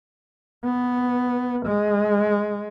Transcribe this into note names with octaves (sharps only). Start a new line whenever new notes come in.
B3
G#3